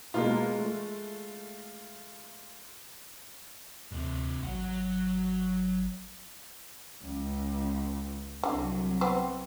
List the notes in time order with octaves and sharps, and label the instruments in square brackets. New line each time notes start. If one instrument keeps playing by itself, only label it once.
[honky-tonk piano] B2 A#3 [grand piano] G#3 F4
[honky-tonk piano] A3
[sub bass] D2 [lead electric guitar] G2 C3
[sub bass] G#1 [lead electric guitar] F#3 F#5
[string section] C#2
[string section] C2 F#3 [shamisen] D3
[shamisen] B3 C4